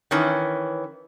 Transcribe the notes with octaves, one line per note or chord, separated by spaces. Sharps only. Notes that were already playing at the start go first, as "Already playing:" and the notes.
D#3 E3 C#4